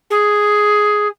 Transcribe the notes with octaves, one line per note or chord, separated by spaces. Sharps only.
G#4